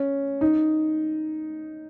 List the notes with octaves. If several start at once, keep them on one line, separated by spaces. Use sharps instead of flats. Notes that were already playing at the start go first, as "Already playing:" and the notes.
Already playing: C#4
D#4